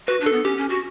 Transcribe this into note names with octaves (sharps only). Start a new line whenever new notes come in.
F#4 B4
D4
A4
B3
C#4 G4
C#4
F#4